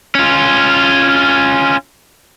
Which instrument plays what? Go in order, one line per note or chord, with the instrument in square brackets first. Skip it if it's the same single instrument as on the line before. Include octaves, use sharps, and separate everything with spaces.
[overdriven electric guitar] C#4 F4